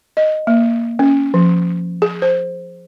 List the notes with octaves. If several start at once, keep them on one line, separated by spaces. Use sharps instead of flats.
D#5
A#3
C#4
F3
G#4
C5